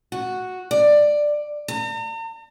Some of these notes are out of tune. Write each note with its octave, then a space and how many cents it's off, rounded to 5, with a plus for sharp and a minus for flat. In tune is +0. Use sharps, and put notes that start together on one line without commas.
F#4 -5
D5 +10
A#5 -45